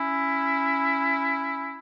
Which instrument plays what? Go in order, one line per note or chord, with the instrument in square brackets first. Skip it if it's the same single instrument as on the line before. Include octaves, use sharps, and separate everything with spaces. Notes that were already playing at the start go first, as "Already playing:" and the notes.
Already playing: [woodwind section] C#4 E4